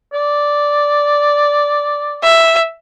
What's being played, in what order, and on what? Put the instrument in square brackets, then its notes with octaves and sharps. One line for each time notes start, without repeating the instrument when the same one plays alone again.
[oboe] D5
[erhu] E5